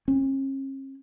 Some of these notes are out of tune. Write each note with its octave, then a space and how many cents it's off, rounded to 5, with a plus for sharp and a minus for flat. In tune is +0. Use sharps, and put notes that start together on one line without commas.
C#4 -45